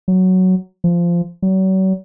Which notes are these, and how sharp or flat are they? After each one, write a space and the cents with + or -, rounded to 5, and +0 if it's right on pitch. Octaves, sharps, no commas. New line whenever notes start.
F#3 +5
F3 -15
F#3 +40